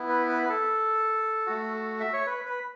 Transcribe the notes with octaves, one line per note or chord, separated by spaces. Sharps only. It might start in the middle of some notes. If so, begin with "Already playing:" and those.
Already playing: B3 E4
B4
B4
B4
A4
A3 F#4
E5
C#5
B4
B4